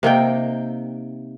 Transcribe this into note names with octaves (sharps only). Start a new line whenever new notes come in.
C3 A#3 D#4 G5